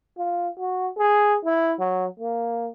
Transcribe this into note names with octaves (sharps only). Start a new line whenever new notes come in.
F4
F#4
G#4
E4
F#3
A#3